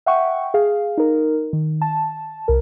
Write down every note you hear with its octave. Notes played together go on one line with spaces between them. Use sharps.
E5 F#5 G5 C#6
G#4 F5
D#4 A#4
D#3
A5
C2 A#4